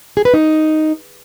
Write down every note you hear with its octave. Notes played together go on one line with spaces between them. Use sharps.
G#4
B4
D#4